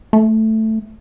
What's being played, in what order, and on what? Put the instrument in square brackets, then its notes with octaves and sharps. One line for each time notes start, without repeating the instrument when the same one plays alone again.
[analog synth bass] A3